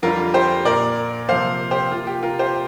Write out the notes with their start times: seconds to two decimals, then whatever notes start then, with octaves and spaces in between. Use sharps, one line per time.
0.03 F2 D3 G3 F4 A#4
0.34 G4 C5
0.65 A#2 A#3 A#4 D5
1.28 C3 F3 A#3 C5 F5
1.71 G4 C5
1.91 C3 A#3 F4
2.07 G4
2.23 F4 A#4
2.39 G4 C5